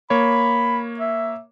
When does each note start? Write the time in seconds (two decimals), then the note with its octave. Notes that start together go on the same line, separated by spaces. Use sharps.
0.10 A#3 C#5 B5
1.00 E5